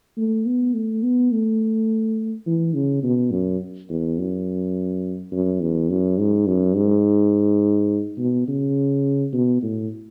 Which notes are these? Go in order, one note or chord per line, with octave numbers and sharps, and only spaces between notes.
A3
B3
A3
B3
A3
E3
C#3
B2
F#2
E2
F#2
F#2
E2
F#2
G#2
F#2
G#2
B2
C#3
B2
A2